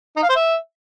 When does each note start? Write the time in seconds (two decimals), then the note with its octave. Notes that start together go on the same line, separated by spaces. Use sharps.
0.16 D#4
0.23 F5
0.29 C5
0.36 E5